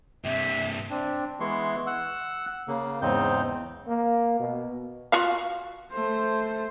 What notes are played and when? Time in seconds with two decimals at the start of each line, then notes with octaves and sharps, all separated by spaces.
0.24 G2 C3 E5
0.90 C4 D4
1.40 E3 G#3 B3 E4 C6 C#6
1.87 F#5 E6
2.68 C#3 A#3
3.02 E2 G#2 C#3 C4 D#4 G6
3.88 A#3
4.40 B2
5.12 F4 F#4 F5
5.92 A3 C5